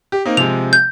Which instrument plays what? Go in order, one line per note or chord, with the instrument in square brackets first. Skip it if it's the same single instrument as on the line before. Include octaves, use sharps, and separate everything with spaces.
[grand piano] G4
A#3 C4 D#4
[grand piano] C3 F3 G#3 [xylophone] F7
[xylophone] G6